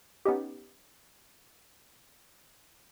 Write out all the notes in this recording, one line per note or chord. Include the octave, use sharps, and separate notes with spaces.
B3 C#4 D#4 G4